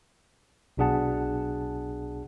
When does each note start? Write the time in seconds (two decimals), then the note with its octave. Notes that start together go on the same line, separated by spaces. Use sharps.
0.77 B1 B2 D4 G#4 F#5 A5